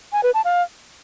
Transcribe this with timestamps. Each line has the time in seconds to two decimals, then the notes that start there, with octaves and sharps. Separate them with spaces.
0.13 G#5
0.23 B4
0.34 A5
0.45 F5